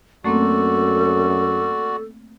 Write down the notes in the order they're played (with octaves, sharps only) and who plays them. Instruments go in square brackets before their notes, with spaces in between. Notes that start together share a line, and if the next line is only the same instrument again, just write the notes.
[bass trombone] F#2 [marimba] A3 A#3 C4 [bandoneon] F#4 D5 [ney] A4